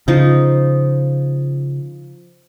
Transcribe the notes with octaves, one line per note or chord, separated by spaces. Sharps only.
C#3 F3 D#4